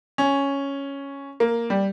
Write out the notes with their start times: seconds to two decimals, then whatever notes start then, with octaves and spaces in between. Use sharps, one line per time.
0.18 C#4
1.40 A#3
1.70 G3